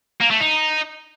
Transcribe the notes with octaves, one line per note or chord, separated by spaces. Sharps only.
A#3
A3
D#4